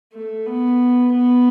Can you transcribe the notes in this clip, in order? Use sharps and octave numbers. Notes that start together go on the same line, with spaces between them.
A3
B3
B3